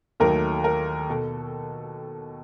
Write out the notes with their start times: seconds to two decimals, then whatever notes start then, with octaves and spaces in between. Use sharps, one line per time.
0.20 D#2 D#3 F#3 A3 A#4
0.64 A#4
1.09 B2 A4